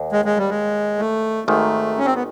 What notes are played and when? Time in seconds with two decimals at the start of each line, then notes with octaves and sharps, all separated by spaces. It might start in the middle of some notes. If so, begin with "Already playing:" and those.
Already playing: D#2
0.12 G#3
0.25 G#3
0.37 G3
0.49 G#3
0.99 A3
1.48 G#1 G#2 D#3 A3
1.98 C#4
2.05 C4
2.15 B3